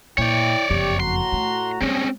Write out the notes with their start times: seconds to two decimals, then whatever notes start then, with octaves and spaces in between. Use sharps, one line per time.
0.18 A#2 E4 C#5 D5 G5
0.70 F#1 F2 G4
1.00 A2 F#4 A#5 C6
1.32 A3
1.82 G3 G#3 C4 C#4 G#4 C#5